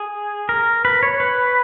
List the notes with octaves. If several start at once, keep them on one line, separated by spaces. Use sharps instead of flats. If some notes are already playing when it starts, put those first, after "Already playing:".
Already playing: G#4
A#4
B4
C#5
B4